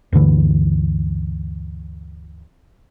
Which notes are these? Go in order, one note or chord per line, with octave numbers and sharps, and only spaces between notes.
D2 G2 D3 E3